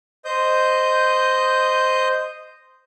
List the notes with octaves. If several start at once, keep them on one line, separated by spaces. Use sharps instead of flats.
C5 D#5 D#6 G6